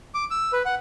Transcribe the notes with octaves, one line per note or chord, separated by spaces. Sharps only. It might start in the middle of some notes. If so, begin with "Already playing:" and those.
D6
E6
B4
F#5